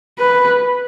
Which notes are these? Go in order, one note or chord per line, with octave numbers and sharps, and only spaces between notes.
B4